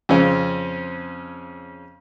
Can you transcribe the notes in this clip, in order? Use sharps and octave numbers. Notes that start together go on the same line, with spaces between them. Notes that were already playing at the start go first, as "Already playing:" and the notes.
F2 C#3 C4 C#4